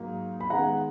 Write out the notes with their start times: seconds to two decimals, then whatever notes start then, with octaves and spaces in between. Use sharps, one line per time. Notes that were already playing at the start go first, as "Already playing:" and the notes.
Already playing: G#2 F#3 A#3 D#4
0.41 B5
0.50 D#3 G#3 B3 F#5 A#5